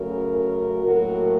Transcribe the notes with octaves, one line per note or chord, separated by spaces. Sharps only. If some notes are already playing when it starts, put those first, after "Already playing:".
Already playing: F#2 C#3 A3 C#4 F#4 A#4
A2 F#3 A#3 F#4 A#4